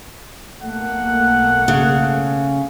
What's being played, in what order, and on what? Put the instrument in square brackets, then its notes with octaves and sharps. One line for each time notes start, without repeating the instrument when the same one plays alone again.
[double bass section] B1 A3 A#3 [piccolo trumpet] F#5
[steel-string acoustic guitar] C#3